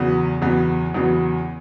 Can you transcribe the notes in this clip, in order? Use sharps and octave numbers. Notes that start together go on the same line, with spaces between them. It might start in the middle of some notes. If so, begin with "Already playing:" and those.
Already playing: E2 C#3 F#3 B3
E2 C#3 F#3 B3
E2 C#3 F#3 B3